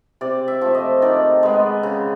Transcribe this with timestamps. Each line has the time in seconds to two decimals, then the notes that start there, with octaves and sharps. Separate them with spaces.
0.21 C3 D5
0.48 E5
0.61 F3 A3
0.75 D#5
1.02 D#3 D5
1.43 G#3 B3
1.83 C#3